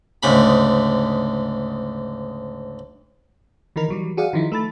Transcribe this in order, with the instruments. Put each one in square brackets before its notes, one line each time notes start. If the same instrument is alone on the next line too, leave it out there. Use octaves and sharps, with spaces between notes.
[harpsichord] D2 G#2 C#3 B5
[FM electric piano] D#3 E3 D#4 A#4
E3 F#3 G3
F#4 G#4 D5 F5 F#5
D#3 F3 D#4 E4
A3 A4 B5 A6